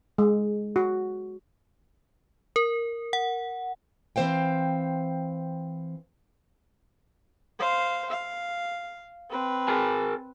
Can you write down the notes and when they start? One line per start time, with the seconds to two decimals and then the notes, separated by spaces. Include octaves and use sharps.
0.18 G#3
0.76 F#4
2.56 A#4
3.13 F#5
4.16 E3 C4 C5 F5 G5
7.59 C5 F5
8.10 F5
9.30 C4 B4
9.68 G#4 A#4 G#5